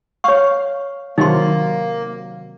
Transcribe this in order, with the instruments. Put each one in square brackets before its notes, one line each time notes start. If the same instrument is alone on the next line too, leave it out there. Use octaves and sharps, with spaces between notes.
[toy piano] C#5 C#6 [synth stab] F5
[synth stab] C3 D#3 F#3 [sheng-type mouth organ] A#3 [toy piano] D#4 C6